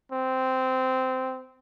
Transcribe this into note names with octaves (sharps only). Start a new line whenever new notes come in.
C4